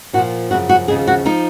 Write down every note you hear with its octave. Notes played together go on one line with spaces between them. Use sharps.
A#2 F3 F#4
F#2 C#3 F3 F#4
F#4
D#2 C#3 F3 G#4
F#4
F3 D#4